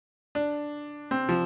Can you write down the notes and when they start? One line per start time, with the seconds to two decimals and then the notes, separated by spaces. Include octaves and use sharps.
0.35 D4
1.11 C4
1.29 F3